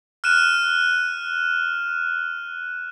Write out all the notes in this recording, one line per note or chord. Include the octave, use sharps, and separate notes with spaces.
F6 F#6 D#7 E7